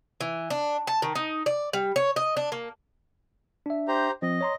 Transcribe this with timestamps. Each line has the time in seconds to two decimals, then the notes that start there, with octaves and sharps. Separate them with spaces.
0.21 E3
0.50 D4
0.87 A5
1.02 D#3
1.15 D#4
1.46 D5
1.73 G3
1.96 C#5
2.16 D#5
2.37 D4
2.52 A#3
3.66 D4 E5
3.88 G4 C5 A#5
4.22 F3 C4 D#5
4.41 C#5 A#5 C6